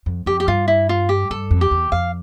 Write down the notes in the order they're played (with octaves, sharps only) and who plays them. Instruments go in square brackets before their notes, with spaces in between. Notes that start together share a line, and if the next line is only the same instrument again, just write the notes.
[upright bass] F2
[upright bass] F2 [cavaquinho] G4
[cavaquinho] G4
[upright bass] G2 [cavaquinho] F4
[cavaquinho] E4
F4
G4
[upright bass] G2 [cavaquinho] A4
[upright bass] F2
[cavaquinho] G4
[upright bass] E2
[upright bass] F2 [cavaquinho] F5